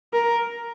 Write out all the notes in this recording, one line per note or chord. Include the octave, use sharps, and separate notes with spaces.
A#4